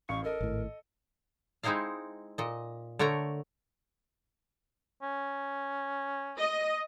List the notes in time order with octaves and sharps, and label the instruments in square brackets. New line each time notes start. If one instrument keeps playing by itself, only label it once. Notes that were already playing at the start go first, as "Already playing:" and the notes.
[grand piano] A1 F5 C#7 [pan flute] C#6
[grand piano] A4 D#5 [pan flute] A#4
[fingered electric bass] G#1 A2
[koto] G#3 C4 D#4 E4 D#5 F5
A#2 D#5
D3 A3 A#4 C#5 A#5
[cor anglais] C#4
[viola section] D#5